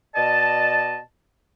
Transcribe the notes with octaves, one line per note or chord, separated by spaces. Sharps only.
B2 D5 D#5 A5